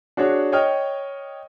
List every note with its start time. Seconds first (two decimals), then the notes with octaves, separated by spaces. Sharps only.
0.17 D4 F#4 G#4 C#5
0.52 C#5 D#5 G5 D#6 F6